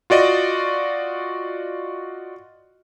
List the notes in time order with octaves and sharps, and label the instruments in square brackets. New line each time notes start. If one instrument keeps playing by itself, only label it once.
[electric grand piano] F4 F#4 D5 D#5